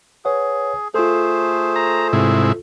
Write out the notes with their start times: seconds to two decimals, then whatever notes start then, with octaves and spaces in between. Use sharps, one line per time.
0.25 G#4 B4 C#5 F#5
0.94 A3 F4 G#4 A4 C5
1.76 A#5
2.13 G#2 C3 E4